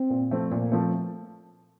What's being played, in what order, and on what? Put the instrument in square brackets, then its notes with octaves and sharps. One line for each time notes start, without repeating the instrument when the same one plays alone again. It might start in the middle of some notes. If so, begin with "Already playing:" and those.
Already playing: [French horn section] C4
[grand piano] A#2
F3 A3 C4
[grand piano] A#2 [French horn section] A#3
[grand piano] F3 A3 C4